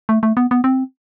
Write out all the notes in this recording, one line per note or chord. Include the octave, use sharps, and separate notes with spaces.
A3
A3
B3
B3
C4